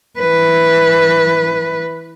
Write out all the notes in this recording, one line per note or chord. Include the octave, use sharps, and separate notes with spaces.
E3 B4